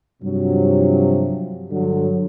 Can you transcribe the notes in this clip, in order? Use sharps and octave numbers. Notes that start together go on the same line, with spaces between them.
G2 C3 F3 F#3
G2 D3 F#3